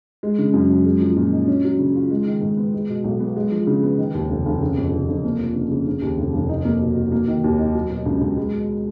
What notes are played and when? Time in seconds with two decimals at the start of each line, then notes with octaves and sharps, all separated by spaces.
0.23 G#3
0.38 C#3
0.54 F#2
0.70 F#2
0.85 G#3
1.01 F3
1.17 A#2
1.32 D#4
1.47 C#4
1.64 F#3
1.79 C#3
1.95 F4
2.11 G#3
2.26 D#3
2.41 G#2
2.57 B3
2.74 G#3
2.89 B2
3.04 B1
3.20 B3
3.36 G#3
3.51 F3
3.67 C#3
3.83 B3
3.98 D#3
4.14 D#2
4.30 F1
4.46 F1
4.61 C#3
4.78 F2
4.92 F1
5.08 F1
5.24 A#3
5.39 F3
5.55 C#3
5.71 C#3
5.86 C#3
6.02 D#2
6.18 F1
6.34 F1
6.49 D#4
6.65 A#3
6.81 B2
6.96 F#4
7.12 A#3
7.28 D#3
7.44 D#2
7.59 D#4
7.75 F#3
7.90 B2
8.06 C#2
8.21 C#2
8.37 G#3
8.53 B2